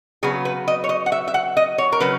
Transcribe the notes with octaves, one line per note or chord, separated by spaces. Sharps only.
C#3 F#3 B3 G#4
B4
D#5
C#5
D#5
F#5
E5
E5
F#5
D#5
C#5
A#4
C#3 F#3 C#4 B4